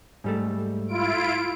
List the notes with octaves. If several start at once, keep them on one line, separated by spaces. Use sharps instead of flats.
G#2 G3 A3
E4 F4 D7